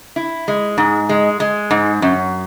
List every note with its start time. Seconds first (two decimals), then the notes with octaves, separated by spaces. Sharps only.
0.16 E4
0.48 G#3
0.78 G#2
1.09 G#3
1.40 G#3
1.71 G#2
2.02 F#2